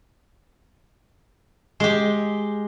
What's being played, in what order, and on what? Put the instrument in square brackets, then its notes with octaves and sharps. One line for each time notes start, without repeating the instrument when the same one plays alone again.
[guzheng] G#3 G4